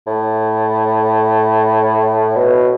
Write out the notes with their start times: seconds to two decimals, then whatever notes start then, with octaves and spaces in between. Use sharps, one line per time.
0.07 A2
2.36 B2